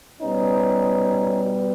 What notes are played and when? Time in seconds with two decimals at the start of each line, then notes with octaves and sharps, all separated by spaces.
0.21 B2 G3 B3 C#4 D#4